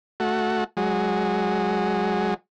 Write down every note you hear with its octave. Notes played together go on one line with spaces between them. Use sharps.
A3 F#4
F#3 G#3